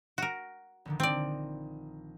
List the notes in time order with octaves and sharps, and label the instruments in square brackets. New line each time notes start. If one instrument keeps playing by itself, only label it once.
[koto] F#4 A#4
[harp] A#1 D3 D#3
[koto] C4 D5 [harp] D#4